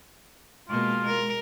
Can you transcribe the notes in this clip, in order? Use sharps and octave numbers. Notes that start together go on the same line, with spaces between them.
B2 G#3 A#3 F4
A#4